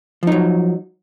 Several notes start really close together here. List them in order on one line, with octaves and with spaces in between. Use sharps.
F3 D#4 F#3